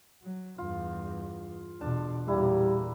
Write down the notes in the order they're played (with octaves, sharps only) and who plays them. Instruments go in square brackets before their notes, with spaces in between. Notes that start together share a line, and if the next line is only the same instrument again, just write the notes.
[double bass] F#3
[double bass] E2 G2 [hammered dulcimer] F4
[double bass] E2 B2 [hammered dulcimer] D4 A5
[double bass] E2 A#2 [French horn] G3 [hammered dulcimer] A#3 E4